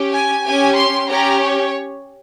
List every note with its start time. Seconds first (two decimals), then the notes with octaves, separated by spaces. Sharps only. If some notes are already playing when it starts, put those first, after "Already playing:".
Already playing: C#4 G4
0.13 G#5
0.44 C#4 G4 G#5
0.76 C6
1.09 C#4 G4 A#5
1.41 C#5